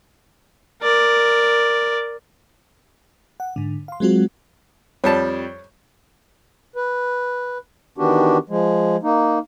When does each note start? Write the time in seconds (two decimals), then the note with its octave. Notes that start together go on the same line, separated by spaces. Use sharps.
0.82 A#4 D5
3.40 F#5
3.56 G#2 D3
3.88 F5 C6
4.00 F#3 G#3 C4 F4 F#4
5.04 F2 G3 C#5 A5
6.76 B4
7.98 D#3 E3 B3 D4 F#4 G4
8.49 F3 G#3
9.03 A#3 D#4